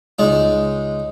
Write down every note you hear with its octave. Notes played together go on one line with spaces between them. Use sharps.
C#2 G#3 D#4